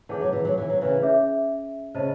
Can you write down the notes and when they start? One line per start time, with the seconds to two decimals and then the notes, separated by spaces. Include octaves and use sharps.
0.09 E3 G#4 C#5 F#5 A5
0.21 F#3
0.33 E3
0.45 F#3
0.58 E3
0.70 F#3
0.81 C#3 E3
1.02 C#4 G#4 C#5 E5
1.95 C#3 C5 D#5 A5